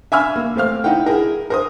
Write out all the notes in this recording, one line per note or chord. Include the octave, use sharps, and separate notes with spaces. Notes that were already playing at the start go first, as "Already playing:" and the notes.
E5 F5 G#5 B5 E6 F6
A#3
A3 C4 F5 F6
D#4 E4 F#5 G5
E4 G#4 A#4
A#4 C5 D#6